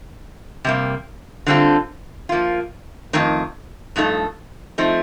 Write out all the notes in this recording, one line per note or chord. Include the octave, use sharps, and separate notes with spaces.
C3 G3 A#3
D3 G3 C4 F4 A4
F3 A#3 F4
F2 D#3 A3 D#4 A#4
G2 F3 A3 D#4 A4
F3 A3 C4 D#4